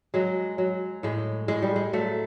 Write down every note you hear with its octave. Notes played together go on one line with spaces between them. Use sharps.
F#3 G#3
F#3
A2 G#3
A2 G#3
G3
G#3
F#3 A3